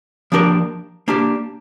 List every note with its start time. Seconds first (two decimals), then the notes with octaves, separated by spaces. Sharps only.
0.32 F3 A#3 D4 G4 A#4
1.08 A#3 D4 G4